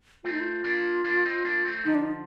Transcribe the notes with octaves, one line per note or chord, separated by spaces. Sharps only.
A3 C4 F4
D#4
F4
A#3 D4
A#3 D4
C4 D#4
A#3 D4
A3 C4
D3 F3 D#4
D4
D#4